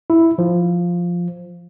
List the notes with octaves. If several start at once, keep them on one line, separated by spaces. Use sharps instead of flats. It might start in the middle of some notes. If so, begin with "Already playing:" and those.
E4
F3